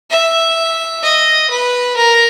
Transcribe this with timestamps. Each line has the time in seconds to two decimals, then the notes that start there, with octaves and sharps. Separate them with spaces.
0.11 E5
1.03 D#5
1.50 B4
1.97 A#4